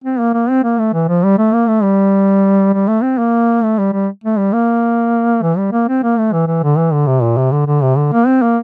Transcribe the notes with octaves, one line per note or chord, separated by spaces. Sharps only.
C4
A#3
A#3
C4
A#3
A3
E3
F3
G3
A3
A#3
A3
G3
G3
A3
C4
A#3
A3
G3
G3
A3
G3
A#3
E3
G3
A#3
C4
A#3
A3
E3
E3
D3
E3
D3
C3
A#2
C3
D3
D3
C3
D3
A#3
C4
A#3